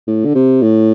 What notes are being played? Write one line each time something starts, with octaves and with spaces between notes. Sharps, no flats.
A2
D3
C3
A2